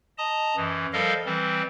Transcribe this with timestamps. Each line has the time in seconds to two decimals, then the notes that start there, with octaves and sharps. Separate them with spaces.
0.18 D#5 A5 A#5 D#6
0.56 F#2 E3
0.93 F3 G3 A4 A#4 D#5 F5
1.25 E3 G3 C4